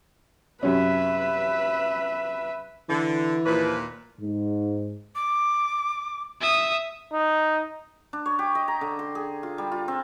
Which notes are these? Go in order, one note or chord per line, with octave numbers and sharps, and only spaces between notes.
F#2 C3 C#4 B4 E5
D3 E3
D#2 A#2 F3 B4
G#2
D6
E5 D#6
D#4
D4
C#5
G4
D#5
A#5
D3
C6
G#4
F4
G3
F4
C4